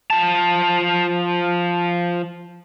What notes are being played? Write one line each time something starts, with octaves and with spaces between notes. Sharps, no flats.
F3 A5